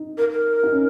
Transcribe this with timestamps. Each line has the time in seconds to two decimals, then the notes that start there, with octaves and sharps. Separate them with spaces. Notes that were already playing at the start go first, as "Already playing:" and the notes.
Already playing: D#4
0.18 A#4
0.32 A#4
0.63 D#4
0.72 C#4